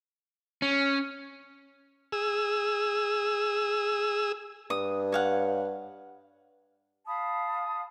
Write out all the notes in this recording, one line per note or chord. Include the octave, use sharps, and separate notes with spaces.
C#4
G#4 E6
G2 D#6
C#5 F5 F#5
F5 A5 B5 D#6